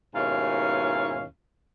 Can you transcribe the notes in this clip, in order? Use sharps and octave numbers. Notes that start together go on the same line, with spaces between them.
D#2 G#2 B2 C#4 E4 F5